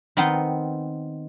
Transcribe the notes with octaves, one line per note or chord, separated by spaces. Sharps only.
D#3 B3 C4 D#4